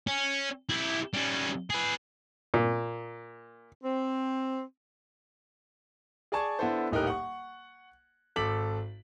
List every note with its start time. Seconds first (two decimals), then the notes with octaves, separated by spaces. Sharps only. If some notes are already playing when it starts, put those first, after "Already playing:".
0.07 C#4
0.69 E4 G4
1.14 G3 C#4
1.70 G#4 B4
2.54 A#2
3.83 C4
6.32 G#4 D5 G#5 A5 C#6 G#6
6.59 D3 B3 E4 A4 C5
6.91 D#1 A2 D#4 G4 A#4 F#6
7.07 F#5 C#6
8.36 G#1 A4 D6 B6 F#7